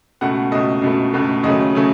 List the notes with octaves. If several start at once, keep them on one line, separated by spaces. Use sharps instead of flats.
C#2 B2 A3 F#5
C#2 B2 A3 D#5
C#2 B2 A3
C#2 B2 A3
D#2 C#3 F#3 A3 D#5
C#3 F#3 A3